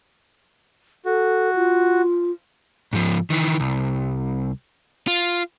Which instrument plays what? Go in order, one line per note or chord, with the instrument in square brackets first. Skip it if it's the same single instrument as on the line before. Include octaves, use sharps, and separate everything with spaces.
[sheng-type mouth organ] F#4 [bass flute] A4
[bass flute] F4
[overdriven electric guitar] G#2 F3
D#3 E3
C2
F4